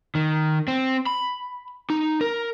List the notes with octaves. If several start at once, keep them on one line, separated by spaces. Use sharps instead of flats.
D#3
C4
B5
D#4
A#4